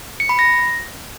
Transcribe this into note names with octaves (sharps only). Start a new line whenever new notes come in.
C#7
B5
A#6